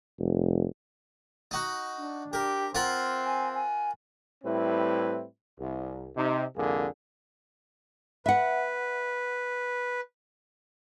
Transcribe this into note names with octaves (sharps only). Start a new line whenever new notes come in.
F1
D#4 F#4
D4
G4 A#4
C4 F4 A#4 F#5
G#5
G#5
A2 G3 C4 E4 B4
C2
C3 D#4
C2 F2 D3 A#3 G#4
B4 E5 F#5